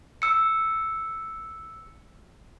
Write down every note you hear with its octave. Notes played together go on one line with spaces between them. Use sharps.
E6 C#7